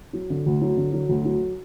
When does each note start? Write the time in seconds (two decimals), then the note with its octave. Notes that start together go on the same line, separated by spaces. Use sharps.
0.13 F#3
0.30 D3
0.46 D2
0.61 F#3
0.77 D3
0.93 F#3
1.09 D2
1.25 F#3